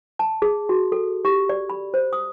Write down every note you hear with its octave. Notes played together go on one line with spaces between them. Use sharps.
A5
G#4
F#4
A4
G4
D5
B5
C5
D#6